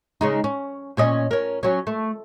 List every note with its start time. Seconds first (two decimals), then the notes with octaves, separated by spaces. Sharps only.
0.21 C#3 G#3 D#4
0.44 C#4
0.97 A#2 C#4 D#5
1.31 C#4 A#4
1.63 F#3 C#4
1.87 A3